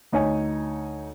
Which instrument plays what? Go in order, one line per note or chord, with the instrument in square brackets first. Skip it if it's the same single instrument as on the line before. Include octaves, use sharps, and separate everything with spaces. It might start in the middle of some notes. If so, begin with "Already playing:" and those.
[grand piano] D2 D#4 C#5 G#5